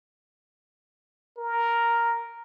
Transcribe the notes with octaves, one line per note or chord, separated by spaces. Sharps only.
A#4